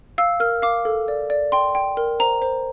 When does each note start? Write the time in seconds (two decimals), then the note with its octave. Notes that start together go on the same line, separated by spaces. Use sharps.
0.18 F5 E6
0.40 A#4 F6
0.62 F5 D6
0.85 A4
1.08 D5
1.30 D5
1.52 G5 C6
1.75 G5
1.97 A#4
2.20 C5 A#5
2.42 C5